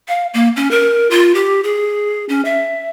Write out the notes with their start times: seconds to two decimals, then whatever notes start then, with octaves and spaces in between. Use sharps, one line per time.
0.08 F5
0.34 A#3
0.56 C#4
0.71 A#4
1.11 F4
1.35 G4
1.64 G#4
2.29 C#4
2.45 E5